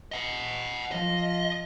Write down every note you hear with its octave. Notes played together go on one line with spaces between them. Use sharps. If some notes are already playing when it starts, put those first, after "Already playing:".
D#5 F#5
F3 D#5